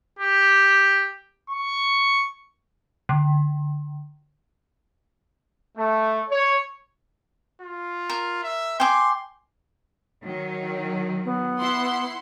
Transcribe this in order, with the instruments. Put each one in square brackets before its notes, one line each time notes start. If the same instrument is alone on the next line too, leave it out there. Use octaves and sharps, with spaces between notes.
[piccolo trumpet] G4
C#6
[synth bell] D3
[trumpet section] A3
C#5
[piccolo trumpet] F4
[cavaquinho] A#4
[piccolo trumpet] E5
[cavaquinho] G5 G#5 D6 [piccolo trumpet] C6
[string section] D#3 F#3
[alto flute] B3
[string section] E4 F#5 C6